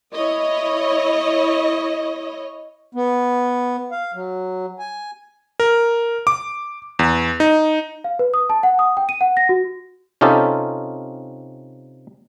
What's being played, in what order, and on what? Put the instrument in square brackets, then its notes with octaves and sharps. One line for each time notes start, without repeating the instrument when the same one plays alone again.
[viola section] E4 C#5 D#5
[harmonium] B3
F5
F#3
G#5
[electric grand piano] A#4
D6
E2
D#4
[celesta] F5
B4
D#6
A5
F#5
D#6
G5
D#7
F#5
A#6
F#4
[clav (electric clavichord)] C3 C#4 D#4 F4 G4 A4